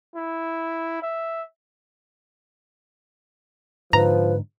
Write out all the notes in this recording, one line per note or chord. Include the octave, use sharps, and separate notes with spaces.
E4
E5
G#2 D3 F3 B4 A#5